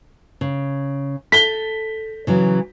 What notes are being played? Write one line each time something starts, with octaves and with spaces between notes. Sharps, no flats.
C#3
A4 B6 G7
C#3 E3 F#3